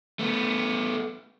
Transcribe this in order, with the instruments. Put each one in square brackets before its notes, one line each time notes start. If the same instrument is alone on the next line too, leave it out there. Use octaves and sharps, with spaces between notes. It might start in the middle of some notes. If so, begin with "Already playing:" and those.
[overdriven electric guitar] A3 B3